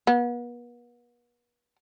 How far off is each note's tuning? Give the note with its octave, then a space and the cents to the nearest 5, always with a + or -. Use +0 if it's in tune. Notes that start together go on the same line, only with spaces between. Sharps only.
B3 -40